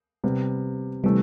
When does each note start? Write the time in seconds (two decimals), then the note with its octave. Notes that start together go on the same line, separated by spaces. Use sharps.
0.24 C3 G3 B3
1.03 C3 E3 G3 A3